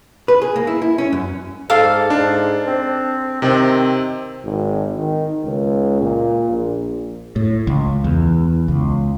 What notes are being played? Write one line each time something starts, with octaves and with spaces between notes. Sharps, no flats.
B4
G#4
A#3
E4
E4
C#4
F#2
G#2 A4 D5 F5
G#2 D4
C4
C3 D#3 C4
G#1
D#3
C#2
A#2
A#1
A2
C#2
E2
C#2